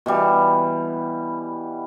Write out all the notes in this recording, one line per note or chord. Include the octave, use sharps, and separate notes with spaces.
B2 E3 G3